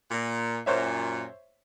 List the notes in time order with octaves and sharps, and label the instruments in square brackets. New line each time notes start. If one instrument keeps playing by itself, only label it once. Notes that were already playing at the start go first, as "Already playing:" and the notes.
[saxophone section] A#2
[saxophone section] F#2 A#2 [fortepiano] C5 C#5 E5